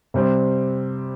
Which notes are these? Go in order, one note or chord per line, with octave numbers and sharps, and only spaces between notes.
C3 G3 C4